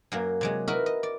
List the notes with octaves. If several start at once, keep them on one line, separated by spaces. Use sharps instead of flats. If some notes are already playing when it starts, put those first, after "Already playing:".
F#2 F#3 A#3
C3 F#3 G#3
E4 F#4 A#4 B4 D#5
D#5
D5